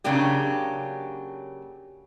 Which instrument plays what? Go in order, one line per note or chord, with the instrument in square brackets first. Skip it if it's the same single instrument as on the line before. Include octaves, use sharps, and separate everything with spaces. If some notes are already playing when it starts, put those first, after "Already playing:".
[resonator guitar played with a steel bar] C#3 F#3 A#3 D4 G4